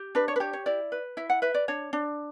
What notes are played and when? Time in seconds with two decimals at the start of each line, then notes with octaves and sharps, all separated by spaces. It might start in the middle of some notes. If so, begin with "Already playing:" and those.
Already playing: G4
0.15 D4 B4
0.28 C#5
0.36 B4
0.40 G4 C#5
0.53 C#5
0.66 E4 D5
0.92 B4
1.17 E4 E5
1.30 F#5
1.42 B4 E5
1.54 D5
1.68 D4 C#5
1.93 D4